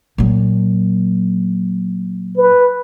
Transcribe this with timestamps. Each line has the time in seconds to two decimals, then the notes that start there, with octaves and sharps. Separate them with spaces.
0.18 A#2 F#3
2.36 B4